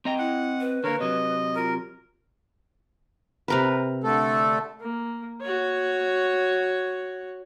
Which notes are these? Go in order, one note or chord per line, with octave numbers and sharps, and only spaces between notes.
C4 D#5 G5 A#5
E4 F#5
B4
D3 A#3 A#4 C#5
C3 F#3 D#5
F4 A#4
C3 A#4 B4
D3 A3 A4
A#3
F#4 C#5